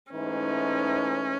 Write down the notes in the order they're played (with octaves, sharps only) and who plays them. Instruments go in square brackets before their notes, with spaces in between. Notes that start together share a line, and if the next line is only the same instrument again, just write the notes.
[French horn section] G#2 E3 A3 D#4 [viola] C#4